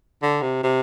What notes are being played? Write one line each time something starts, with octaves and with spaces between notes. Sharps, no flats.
D3
C3
C3